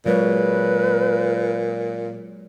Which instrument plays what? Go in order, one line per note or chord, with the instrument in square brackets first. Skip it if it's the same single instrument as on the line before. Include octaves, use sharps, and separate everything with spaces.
[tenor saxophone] A#2 [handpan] F#3 G#3 C#5 [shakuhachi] B4